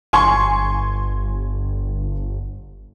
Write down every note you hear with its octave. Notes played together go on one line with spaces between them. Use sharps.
G1 G#5 C6 C#6